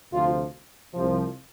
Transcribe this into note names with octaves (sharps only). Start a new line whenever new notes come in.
D2 C3 F3 F4
C2 C3 F3